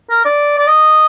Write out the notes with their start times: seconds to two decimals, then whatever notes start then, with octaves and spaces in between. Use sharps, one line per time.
0.10 A#4
0.25 D5
0.58 D5
0.67 D#5